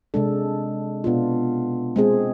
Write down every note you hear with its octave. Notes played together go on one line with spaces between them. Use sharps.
C3 G#3 D4 A4
B2 B3 D4 F4
G#3 C4 G#4